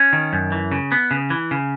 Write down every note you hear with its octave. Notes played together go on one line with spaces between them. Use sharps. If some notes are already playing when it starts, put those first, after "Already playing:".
Already playing: C#4
D#3
F#2
E3
C#3
B3
C#3
E3
C#3